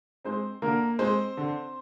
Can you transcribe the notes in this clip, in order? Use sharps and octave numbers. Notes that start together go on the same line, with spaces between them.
G#3 C4 C5
D3 A#3 A#4
G#3 C4 C5
D3